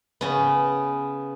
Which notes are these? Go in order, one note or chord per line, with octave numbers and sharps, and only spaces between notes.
C#3 B3